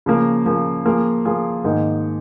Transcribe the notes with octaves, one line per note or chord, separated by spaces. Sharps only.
C#3 F3 A#3
C#3 F3 A#3
F3 A#3 F4 G#4
F3 A#3 F4 G#4
G#2 D#3 A#3